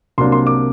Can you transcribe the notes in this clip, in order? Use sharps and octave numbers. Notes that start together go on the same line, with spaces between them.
C2 C3 F#3 A#3 D4 C6
C6
D6